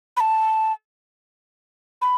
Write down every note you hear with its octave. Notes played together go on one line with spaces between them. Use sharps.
B5
A5
B5